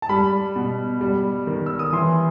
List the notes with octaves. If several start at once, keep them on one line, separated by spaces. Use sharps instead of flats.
A5
G3 B5
B2
G3
D#3
E6
D#6
E3 C6